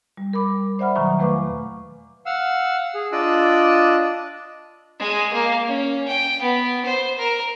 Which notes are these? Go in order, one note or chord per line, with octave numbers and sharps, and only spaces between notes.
G3
A#4 B5 D6
G3
C5 D5 E5 F#5 B5 F6
B2 D#3 F#3 A#5 C#6
E2 A3 B4 F5 C#6 D6
F5 F#5 E6
G#4
D4 F4 D#5 D6 E6 F#6
G#3
A#3
C#4
G5
B3
C5
A#4